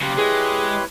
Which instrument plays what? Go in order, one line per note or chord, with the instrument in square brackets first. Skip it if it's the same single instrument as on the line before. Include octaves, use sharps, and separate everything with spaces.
[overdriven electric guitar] C#3 A#3 [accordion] G4 C6 F#6
[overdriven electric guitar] G#3 [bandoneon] E4 B4 C#5 [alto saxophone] G#4